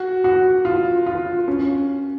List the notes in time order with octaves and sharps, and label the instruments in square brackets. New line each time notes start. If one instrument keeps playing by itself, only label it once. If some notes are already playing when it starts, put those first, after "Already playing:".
Already playing: [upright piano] F#4
F#4
F4
F4
C#4